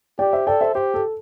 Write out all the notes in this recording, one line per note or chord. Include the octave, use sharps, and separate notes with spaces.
G4 D5 G5
C5 E5
A4 D5 G5
C5 E5
G4 C5
A4